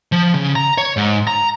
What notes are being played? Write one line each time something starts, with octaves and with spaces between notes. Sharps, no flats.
F3
C#3
A#5
C#5
G#2
A#5